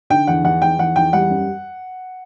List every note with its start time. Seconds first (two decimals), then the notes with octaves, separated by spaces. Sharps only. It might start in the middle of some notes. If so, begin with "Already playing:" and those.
0.10 D3 G5
0.27 E2 F#5
0.44 E2 F#5
0.62 E2 G5
0.78 E2 F#5
0.96 E2 G5
1.13 G3 F#5
1.30 F#2